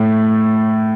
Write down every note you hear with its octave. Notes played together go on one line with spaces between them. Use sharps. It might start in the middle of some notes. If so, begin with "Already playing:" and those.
Already playing: A2 A3